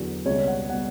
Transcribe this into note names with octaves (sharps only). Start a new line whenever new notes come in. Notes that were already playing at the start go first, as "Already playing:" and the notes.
Already playing: E2 D3 F#3
C#2 B2 G3 C#5
F#5
B2 G3 F#5